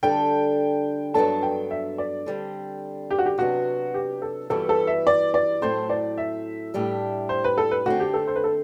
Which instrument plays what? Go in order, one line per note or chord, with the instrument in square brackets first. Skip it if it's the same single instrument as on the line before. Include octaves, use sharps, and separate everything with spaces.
[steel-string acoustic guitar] D3 G3 D4 A4 [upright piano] G5
[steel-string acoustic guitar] G2 F#3 B3 D4 A4 [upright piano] A5
[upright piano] G5
E5
D5
[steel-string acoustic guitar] D3 G3 C4
[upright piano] G4
F#4
G4
[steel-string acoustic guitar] C3 F#3 B3 D4 [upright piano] F#4
[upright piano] G4
A4
[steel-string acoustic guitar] G2 E3 G3 B3 F#4 [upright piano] A4
[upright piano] A4
E5
D5
D5
[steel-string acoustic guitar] A2 F#3 A3 C4 [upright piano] C5
[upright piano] D5
E5
[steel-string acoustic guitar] A2 G3 D4 G4
[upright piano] C5
B4
A4
B4
[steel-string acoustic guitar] D3 A3 C4 [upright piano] F#4
[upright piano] G4
A4
C5
B4
A4